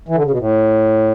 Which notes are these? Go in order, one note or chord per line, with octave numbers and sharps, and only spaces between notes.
E3
D3
C#3
B2
A2